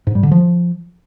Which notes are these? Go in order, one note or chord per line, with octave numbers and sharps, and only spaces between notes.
G#2
G3
D3
F3